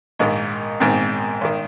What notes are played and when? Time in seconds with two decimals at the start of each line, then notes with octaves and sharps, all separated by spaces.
0.19 A#1 G#2 D#3 D#4
0.80 A#1 G#2 D#3 C4
1.41 G#1 D#3